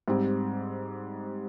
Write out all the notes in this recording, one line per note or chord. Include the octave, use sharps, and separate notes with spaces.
G#2 G3 C4